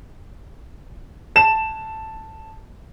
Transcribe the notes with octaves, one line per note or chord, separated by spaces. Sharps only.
A5 E7